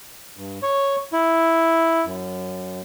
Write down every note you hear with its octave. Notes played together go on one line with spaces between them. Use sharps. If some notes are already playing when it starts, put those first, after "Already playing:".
G2
C#5
E4
F#2